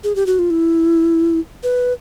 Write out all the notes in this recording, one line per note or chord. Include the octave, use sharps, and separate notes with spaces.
G#4
G4
F#4
F4
E4
B4